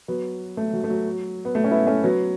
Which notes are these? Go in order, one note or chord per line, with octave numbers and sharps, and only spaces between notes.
F#3 B3
A3
F#3
A3
F#3
B3
A3
C#4
B3 E4
A3 C#4
F#3 B3